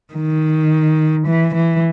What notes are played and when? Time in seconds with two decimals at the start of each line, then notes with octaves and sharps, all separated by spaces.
0.14 D#3
1.27 E3
1.55 E3